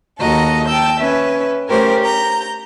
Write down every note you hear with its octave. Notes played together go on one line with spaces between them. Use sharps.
D#2 F#4 A4 D#5 A#5
G5 A5 E6 G6
C#4 B4 E5
A3 C#4 G4 A#4 C5 C#5
A#5 G6